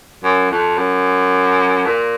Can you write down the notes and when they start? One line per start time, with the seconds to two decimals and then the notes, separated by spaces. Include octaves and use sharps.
0.24 F#2
0.50 F2
0.77 F#2
1.86 A#2